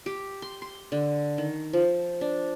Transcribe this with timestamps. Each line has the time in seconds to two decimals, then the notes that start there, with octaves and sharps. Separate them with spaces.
0.06 G4
0.42 C6
0.62 C6
0.92 D3
1.38 D#3
1.73 F3
2.21 D4